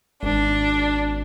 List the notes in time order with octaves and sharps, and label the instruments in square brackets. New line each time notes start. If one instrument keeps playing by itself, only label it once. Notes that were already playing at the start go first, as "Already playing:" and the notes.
[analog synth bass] G#1 [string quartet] D4